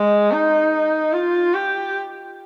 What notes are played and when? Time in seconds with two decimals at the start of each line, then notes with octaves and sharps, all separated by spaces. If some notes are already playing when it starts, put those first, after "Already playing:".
Already playing: G#3
0.32 D#4
1.13 F4
1.54 G4